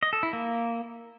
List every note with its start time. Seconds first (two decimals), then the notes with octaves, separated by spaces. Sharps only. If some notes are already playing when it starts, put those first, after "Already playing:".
0.03 D#5
0.13 A4
0.23 E4
0.33 A#3